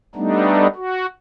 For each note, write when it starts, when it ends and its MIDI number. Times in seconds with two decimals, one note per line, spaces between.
0.15 0.67 55
0.15 0.67 57
0.15 0.67 59
0.15 0.67 62
0.15 0.67 63
0.75 1.06 66